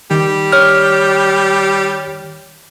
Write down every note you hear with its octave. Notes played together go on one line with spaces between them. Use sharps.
D#3 G3
C#5 F6